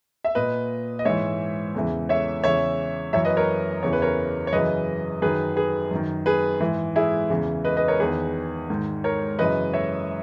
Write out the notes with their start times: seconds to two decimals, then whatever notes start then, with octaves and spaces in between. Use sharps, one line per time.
0.24 E5
0.35 A#2 B4 D#5
0.99 D#5
1.05 G#2 E3 C#5 E5
1.75 E2 C#3 E3
2.09 C#5 E5
2.44 E2 C#3 E3 C#5 E5
3.13 F#2 E3 C#5 E5
3.25 B4 D#5
3.37 A#4 C#5
3.83 E2 C#3 E3 C#5
3.93 B4
4.02 A#4 C#5
4.47 C#5
4.52 F#2 C#3 E3 B4 D#5
5.22 F#2 D#3 G#4 B4
5.56 G#4 B4
5.91 F#2 D#3
6.26 G#4 B4
6.60 G#2 E3
6.96 E4 G#4
7.30 E2 C#3 E3
7.65 B4 D#5
7.77 B4 D#5
7.88 A#4 C#5
8.00 E2 D#3 G#4 B4
8.70 G#2 D#3
9.04 A#4 C#5
9.39 F#2 C#3 E3 B4 D#5
9.73 C#5 E5